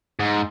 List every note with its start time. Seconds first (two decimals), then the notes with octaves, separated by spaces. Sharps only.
0.20 G#2